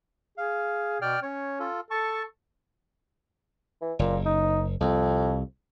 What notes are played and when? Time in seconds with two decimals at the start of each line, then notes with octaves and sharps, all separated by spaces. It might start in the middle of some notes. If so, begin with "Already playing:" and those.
0.38 G#4 F5
1.02 B2 D5 G5 F6
1.23 C#4 C#5
1.60 F4 A4
1.91 A4 A5 C#6
3.82 E3
3.99 F#1 A#2
4.25 D#4
4.80 C2 F2